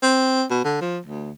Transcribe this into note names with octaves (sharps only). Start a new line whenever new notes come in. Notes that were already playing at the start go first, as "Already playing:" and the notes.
C4
B2
D3
F3
D2